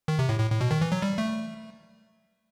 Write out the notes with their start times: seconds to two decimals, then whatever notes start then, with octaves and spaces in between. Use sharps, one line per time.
0.08 D#3
0.19 C3
0.29 A2
0.39 A2
0.50 A2
0.61 B2
0.71 D#3
0.81 E3
0.92 F#3
1.02 G3
1.18 A3